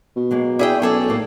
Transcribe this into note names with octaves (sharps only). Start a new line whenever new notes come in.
B2
F#3 G#3 A#3
E4 G#4 D5 E5 G5
B1 C#4 G#4 A4 D5
A2 A#3